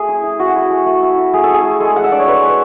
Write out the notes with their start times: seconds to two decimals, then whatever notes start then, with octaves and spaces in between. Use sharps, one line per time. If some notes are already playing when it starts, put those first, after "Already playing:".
Already playing: A3 G#4
0.08 E4
0.24 E4
0.39 E4 F#4
0.56 E4
0.71 A3
0.86 A3
1.03 E4
1.18 E4
1.33 A3 G#4
1.44 A4
1.49 E4
1.54 G#4
1.65 A3
1.80 G#3 A4
1.96 G#3 F#5
2.04 E5
2.12 D4 D5
2.20 C#5
2.27 G#3 B4
2.43 G#3